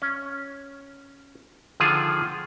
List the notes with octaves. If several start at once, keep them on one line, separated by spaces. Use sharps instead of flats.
C#4
D3 D#3 F3 F4 G#4